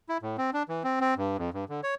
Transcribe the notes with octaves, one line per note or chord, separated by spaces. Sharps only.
E4
A2
C4
D4
E3
C4
C4
G2
F2
G2
D3
C#5